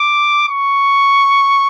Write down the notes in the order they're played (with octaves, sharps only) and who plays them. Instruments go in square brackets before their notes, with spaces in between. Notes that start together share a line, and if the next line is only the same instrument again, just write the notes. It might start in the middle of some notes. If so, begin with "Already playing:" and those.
Already playing: [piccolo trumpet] D6
C#6